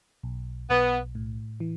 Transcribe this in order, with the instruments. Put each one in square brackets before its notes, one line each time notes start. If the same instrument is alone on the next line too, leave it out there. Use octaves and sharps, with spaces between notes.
[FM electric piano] B1
[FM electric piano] B1 [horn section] B3
[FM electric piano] A2
E3